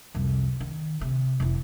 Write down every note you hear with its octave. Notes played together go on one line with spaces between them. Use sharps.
C2 F2
D#3
C3
F1 E3